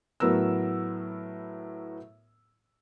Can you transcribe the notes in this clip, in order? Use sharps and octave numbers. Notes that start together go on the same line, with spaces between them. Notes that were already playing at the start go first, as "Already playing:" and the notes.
A2 F#3 B3 A#4 E6